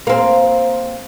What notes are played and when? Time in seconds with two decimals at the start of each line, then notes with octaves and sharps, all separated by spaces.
0.07 A#3 C4